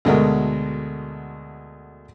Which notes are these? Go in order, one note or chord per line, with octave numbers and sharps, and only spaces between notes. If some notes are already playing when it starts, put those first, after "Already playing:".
D2 B2 G#3 A3 F#4 A#4